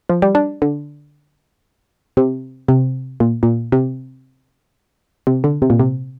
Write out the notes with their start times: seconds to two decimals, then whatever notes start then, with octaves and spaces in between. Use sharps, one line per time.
0.10 F3
0.22 G3
0.35 D4
0.62 D3
2.17 C3
2.68 C3
3.20 A#2
3.43 A#2
3.72 C3
5.27 C3
5.44 D3
5.62 C3
5.70 A#2
5.80 C3